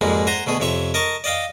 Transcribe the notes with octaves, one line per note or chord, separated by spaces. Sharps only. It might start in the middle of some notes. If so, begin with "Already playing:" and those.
F2 G#2 G3 G#3 A#3
C5 F#5 G#5 A#5 C6
D2 B2 A3 G#4
F2 C3 C#5 E5 C#6
A#4 D#5 A5 C#6
D5 D#5 F5 G5